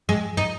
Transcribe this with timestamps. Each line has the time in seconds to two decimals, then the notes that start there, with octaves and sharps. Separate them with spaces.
0.09 G#3
0.37 D#4